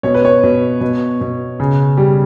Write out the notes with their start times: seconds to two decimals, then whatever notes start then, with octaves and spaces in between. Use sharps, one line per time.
0.03 B2 C#5
0.14 B4
0.25 C#5
0.43 B2
0.81 B2
1.21 B2
1.60 C#3
1.97 G3